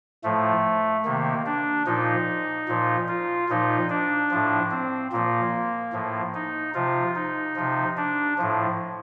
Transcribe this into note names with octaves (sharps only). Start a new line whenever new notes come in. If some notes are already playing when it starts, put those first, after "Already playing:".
A2 F3 A3
C3 D#3 A#3
D4
A#2 F3 D#4
A#2 F3
F4
A#2 F3 D#4
D4
A2 F3
C4
A#2 F3 A#3
A2 F3
D#4
C3 F3 F4
D#4
C3 F3
D4
A2 F3